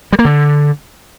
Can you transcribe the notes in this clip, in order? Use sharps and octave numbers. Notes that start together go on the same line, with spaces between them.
G3
A#3
D3